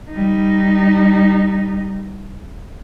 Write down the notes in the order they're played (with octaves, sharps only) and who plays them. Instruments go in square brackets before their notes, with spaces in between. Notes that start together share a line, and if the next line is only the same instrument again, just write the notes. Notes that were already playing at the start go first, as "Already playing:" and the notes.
[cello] G3 D#4